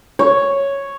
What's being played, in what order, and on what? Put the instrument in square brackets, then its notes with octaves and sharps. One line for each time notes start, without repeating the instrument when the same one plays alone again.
[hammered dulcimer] C#5